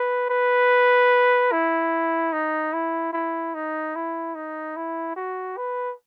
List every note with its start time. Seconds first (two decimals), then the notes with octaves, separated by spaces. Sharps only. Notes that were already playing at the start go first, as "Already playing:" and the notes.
Already playing: B4
0.30 B4
1.52 E4
2.33 D#4
2.73 E4
3.13 E4
3.55 D#4
3.95 E4
4.35 D#4
4.76 E4
5.16 F#4
5.57 B4